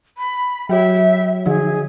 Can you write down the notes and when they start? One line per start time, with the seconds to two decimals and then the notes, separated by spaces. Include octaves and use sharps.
0.18 B5
0.69 F#3 F#4 C#5 E5
1.46 D3 F3 D#4 G#4